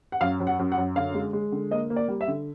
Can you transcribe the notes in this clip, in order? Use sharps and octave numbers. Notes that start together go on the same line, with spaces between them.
F#5
F#2 F5
F#2
F#5
F#2
F#5
F#2
D3 F5
G#3
G#3
D3
A#3 D#5
A#3
D5
G3
E5
D3